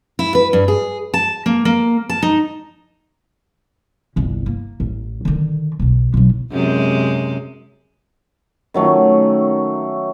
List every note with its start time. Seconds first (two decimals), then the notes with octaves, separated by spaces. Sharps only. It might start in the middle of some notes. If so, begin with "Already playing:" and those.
0.19 E4
0.35 B4
0.53 G2
0.68 G#4
1.14 A5
1.46 A#3
1.65 A#3
2.10 A5
2.22 D#4
4.16 G1 C2
4.46 A#3
4.80 A1
5.25 D3 D#3
5.79 B1 B2
6.14 B1 F#3
6.51 F#2 C3 G#3
8.74 D#3 F#3 A3 C#4